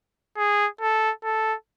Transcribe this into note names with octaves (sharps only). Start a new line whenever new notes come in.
G#4
A4
A4